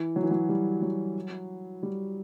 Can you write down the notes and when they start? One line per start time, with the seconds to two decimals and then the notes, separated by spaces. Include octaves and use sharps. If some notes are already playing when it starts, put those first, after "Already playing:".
Already playing: E3
0.16 F#3
0.23 E3
0.31 F#3
0.49 G3
0.82 F#3
1.83 G3